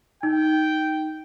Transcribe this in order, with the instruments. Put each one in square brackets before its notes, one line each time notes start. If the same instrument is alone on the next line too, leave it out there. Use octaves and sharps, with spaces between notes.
[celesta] D#4 [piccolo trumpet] G5